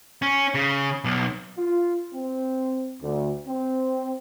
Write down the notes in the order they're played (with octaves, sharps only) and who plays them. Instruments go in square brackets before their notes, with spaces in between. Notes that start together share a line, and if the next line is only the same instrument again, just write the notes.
[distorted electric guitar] C#4
C#3
B1
[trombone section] F4
C4
D2
C4